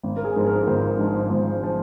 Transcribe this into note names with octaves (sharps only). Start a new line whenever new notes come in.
G#1
A#4
G#4
G#2 F3
A#4
G#1 C5
G#2 F3
G#1
F3